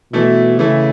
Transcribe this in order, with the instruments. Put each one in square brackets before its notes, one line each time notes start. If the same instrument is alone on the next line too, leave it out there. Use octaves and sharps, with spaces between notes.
[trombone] B2 [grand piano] E3 A3 E4
[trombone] C#3 [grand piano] E3 A3 E4